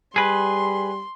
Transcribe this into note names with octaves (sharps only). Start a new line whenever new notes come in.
G3 G#4 B4 C6